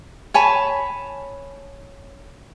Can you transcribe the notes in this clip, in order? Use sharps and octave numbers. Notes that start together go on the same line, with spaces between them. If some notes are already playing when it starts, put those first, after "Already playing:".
C#5 G#5 A5 B5